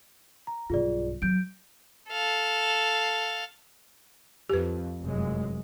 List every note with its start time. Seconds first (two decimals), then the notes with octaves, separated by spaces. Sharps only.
0.47 A#5
0.70 B1 G2 F4 G#4 D5
1.22 F#3 G6 D7
2.10 A4 F5
4.50 F2 G4 B4
5.01 F1 F#2 G#3